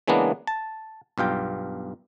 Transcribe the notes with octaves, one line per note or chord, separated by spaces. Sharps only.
C#3 E3 G#3 A#3 B3 D4
A5
B1 G2 F4 G5